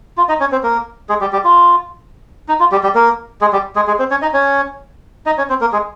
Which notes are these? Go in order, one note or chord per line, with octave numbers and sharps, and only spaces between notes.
F4
D#4 D#5
C#4 C#5
C4 C5
A#3 A#4
G#3 G#4
G3 G4
G3 G4
F4
D#4
F4
G3 G4
G3 G4
A#3 A#4
G#3 G#4
G3 G4
G#3 G#4
G#3 G#4
C4 C5
C#4 C#5
D#4 D#5
C#4 C#5
D#4 D#5
C#4 C#5
C4 C5
A#3 A#4
G#3 G#4